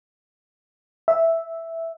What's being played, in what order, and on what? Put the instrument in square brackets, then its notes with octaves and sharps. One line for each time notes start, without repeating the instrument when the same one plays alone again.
[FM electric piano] E5